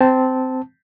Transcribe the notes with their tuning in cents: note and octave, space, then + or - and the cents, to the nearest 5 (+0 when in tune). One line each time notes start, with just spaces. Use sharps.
C4 -15 A5 +0